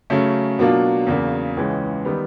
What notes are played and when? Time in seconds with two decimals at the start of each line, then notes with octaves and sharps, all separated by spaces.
0.10 C#3 F#3 A3 C#4
0.59 B2 F#3 A#3 D4 F4
1.07 E2 C#3 F#3 A#3
1.57 C#2 C#3 E3 G#3 C#4
2.05 D#3 G3 B3